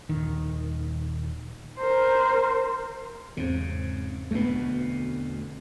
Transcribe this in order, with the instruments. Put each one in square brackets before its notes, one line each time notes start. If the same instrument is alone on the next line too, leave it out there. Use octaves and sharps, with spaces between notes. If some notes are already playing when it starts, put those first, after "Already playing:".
[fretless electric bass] D#1 D#3
[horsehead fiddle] A#4 C5
[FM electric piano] E2 C4 [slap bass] G#2 C#3
[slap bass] D2 B2 [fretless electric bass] A3 B3